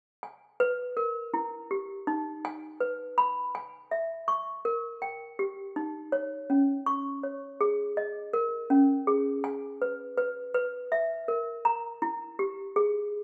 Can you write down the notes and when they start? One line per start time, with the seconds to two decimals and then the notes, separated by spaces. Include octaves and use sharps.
0.23 G#5
0.60 B4
0.97 A#4
1.34 E4
1.71 G4
2.07 D#4
2.45 G#5
2.80 B4
3.18 B5
3.55 G#5
3.91 E5
4.28 C#6
4.65 A#4
5.02 G5
5.39 G4
5.76 D#4
6.12 C#5
6.50 C#4
6.86 C#6
7.23 C#5
7.61 G#4
7.97 D#5
8.33 A#4
8.70 C#4
9.07 G#4
9.44 G#5
9.82 B4
10.18 B4
10.54 B4
10.92 E5
11.28 A#4
11.65 A#5
12.02 E4
12.39 G4
12.76 G#4